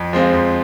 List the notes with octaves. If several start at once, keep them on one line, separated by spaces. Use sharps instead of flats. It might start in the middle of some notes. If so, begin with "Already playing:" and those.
Already playing: F2
F3 G#3 C4 F4
F2